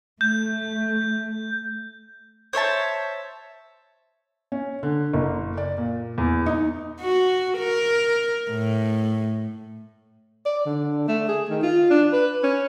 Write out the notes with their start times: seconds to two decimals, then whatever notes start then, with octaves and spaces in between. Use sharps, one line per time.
0.21 A3 G6
2.53 C5 C#5 E5 A5
4.52 C#4
4.83 D3
5.13 F#1
5.57 D5
5.78 A#2
6.18 E2
6.46 D#4
7.01 F#4
7.59 A#4
8.50 A2
10.45 D5
10.66 D3
11.08 A3
11.28 G#4
11.50 D#3
11.63 F4
11.90 D4
12.13 B4
12.43 C#4